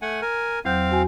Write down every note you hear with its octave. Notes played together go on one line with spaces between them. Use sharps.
A3 F#5 G#5
A#4 G#5
E2 F#3 C4 F5 G6
E2 F#4 G#5